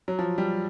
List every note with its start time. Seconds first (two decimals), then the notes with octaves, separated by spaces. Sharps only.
0.08 F#3
0.19 F3
0.38 G3